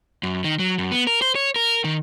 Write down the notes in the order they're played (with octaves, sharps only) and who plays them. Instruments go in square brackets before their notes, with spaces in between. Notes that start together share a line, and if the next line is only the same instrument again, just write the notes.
[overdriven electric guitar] F#2
D#3
F#3
F#2
B3
A#4
C5
C#5
A#4
D#3